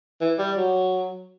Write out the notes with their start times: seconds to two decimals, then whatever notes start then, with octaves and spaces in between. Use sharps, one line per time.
0.21 E3
0.39 G3
0.57 F#3